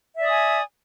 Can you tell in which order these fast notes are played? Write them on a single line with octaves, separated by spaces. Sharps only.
E5 D5 D#6 G#5